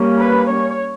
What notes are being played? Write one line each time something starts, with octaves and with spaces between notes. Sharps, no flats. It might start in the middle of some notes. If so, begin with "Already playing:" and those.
Already playing: G3 A#3 C#4
B4
C#5